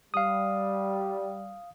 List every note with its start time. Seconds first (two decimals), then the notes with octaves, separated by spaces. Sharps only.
0.14 G3 F5 D#6